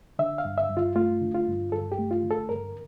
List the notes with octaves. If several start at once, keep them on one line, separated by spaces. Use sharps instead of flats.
D3 E5
F5
G2
E5
G2
F4
A3 F4
D3
F4
G2
G2 A4
G4
A3
F4
D3
A4
G2 A#4